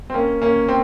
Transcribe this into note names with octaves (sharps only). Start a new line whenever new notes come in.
C4
A#3 C#4
A#3 C#4
C4